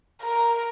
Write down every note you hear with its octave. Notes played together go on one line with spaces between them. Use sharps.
A#4